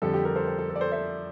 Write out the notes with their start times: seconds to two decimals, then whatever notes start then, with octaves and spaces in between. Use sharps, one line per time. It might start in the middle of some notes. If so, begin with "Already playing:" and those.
0.02 F2 D3 G3 A4
0.14 G4
0.25 G4 A#4
0.36 A4 C5
0.47 A4
0.59 A4
0.70 A4
0.76 D5
0.81 A4 C5
0.92 C5 E5